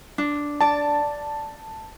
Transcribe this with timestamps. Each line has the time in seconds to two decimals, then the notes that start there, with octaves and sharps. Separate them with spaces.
0.18 D4
0.61 D5 A5